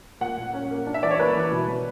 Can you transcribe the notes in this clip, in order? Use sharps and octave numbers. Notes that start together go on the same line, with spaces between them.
A#2 F#5
A#2
C#4
A#3
D4
E5
E3 D5
C#5
A#3 B4
E3
B2
B2